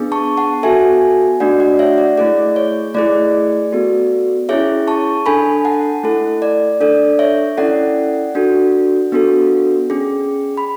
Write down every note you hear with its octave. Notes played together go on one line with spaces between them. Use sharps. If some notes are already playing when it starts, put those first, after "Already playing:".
Already playing: B3 D4 G#4
A5 C#6
F#5 A5
B3 F#4 A4 E5 G#5
A3 D4 F#4 D5 F#5
D5 F#5
C#5 E5
D5
A3 E4 G#4 D5
C#5
A3 E4 G#4 D5
B3 F#4 A4
C#4 E4 G#4 C#5 E5
A5 C#6
D4 A4 G#5 B5
F#5 A5
A3 E4 A4
D5
D4 A4 D5
C#5 E5
C#4 E4 A4 D5 F#5
D4 F#4 A4
B3 D4 F#4 A4
C#4 G#4
B5